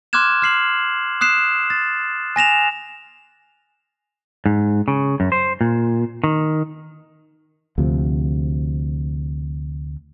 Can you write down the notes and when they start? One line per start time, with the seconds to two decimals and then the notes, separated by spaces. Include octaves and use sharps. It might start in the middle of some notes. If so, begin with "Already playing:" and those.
0.13 C6 D6 F6 F#6 G#6 E7
0.42 F6 C7 F#7
1.21 D#6 F#6 C7 E7
1.70 A6
2.36 G#5 A#6 E7 F7
4.46 G#2
4.88 C#3
5.20 F#2
5.32 C5
5.61 A#2
6.24 D#3
7.78 D2 C3 F3